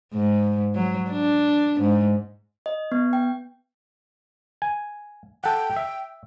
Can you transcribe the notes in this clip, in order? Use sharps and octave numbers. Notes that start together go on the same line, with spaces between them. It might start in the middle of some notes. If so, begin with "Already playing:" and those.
G#2
F#3
D4
G#2
D#5
B3
G5
G#5
A4 F#5 G5
E5